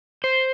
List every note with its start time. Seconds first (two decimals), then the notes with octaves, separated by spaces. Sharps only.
0.24 C5